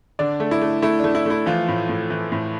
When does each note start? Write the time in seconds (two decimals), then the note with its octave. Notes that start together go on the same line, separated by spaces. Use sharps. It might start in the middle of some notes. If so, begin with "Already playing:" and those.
0.19 D3 D4 D5
0.40 A3
0.51 E4
0.61 A3
0.82 A3 E4
0.99 D4
1.04 A3
1.15 E4
1.26 A3 E4
1.46 E3 F3 F4
1.68 A2
1.89 A2
2.10 E3
2.32 A2